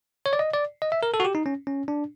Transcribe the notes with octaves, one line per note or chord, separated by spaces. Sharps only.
C#5
D5
D#5
D5
D#5
E5
A#4
A4
F#4
G4
D#4
C#4
C#4
D4